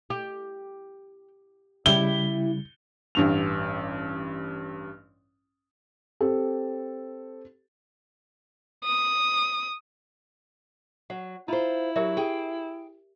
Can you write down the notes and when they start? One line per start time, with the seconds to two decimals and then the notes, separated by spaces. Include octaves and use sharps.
0.10 G4
1.86 C#3 G3 E4 G4 G7
3.15 A1 G2 F7
6.21 C4 G4 A4
8.85 D#6
11.10 F#3 F#5
11.48 E4 F4 C5 A#5 B5
11.96 F#3 G4 A#4 E5
12.17 G4 G#4 G5